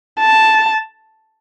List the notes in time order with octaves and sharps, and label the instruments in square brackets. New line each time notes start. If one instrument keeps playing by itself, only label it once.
[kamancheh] A5